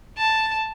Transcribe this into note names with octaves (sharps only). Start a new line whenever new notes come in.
A5